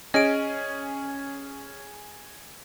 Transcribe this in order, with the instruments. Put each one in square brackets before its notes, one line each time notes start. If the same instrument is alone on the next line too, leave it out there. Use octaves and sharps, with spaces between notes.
[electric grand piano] C#4 [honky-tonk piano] G#4 [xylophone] D#5 D7